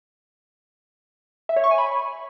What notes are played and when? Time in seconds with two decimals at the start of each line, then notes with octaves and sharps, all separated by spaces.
1.49 E5
1.56 C#5
1.64 C#6
1.71 G#5
1.78 B5